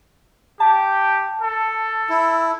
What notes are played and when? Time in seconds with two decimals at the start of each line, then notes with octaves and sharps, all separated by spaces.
0.60 G4 A5
1.42 A4
2.10 E4